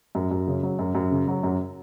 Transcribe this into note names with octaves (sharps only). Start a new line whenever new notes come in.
F#2
F#2
C#3
F#3
F#2
F#2
C#3
F#3
F#2